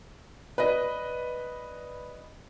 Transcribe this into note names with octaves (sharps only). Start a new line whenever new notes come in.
B4 D5 D#5